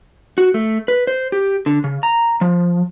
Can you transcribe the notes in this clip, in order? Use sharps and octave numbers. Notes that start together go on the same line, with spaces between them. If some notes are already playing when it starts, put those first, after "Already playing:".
F#4
A3
B4
C5
G4
D3
C#3
A#5
F3